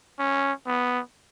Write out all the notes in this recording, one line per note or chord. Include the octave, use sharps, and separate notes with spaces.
C#4
B3